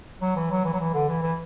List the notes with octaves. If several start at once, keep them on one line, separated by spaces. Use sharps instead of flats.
F#3
E3
F#3
E3
F#3
E3
D3
E3
E3